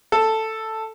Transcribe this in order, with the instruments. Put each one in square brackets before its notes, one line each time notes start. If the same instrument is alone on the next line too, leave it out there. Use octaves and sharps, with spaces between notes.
[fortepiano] A4